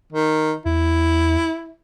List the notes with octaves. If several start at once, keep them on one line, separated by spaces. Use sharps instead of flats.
D#3
E2 E4